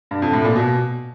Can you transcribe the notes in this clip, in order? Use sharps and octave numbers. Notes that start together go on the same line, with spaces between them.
G2
F2
A2
A#2
B2